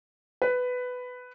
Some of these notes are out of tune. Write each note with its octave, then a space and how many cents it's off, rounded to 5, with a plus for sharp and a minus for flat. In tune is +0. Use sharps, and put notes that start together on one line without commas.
B4 +10